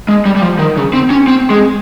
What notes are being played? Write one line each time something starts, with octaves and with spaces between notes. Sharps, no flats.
G#3
G3
G3
F3
D#3
C#3
C4
C#4
C4
G#3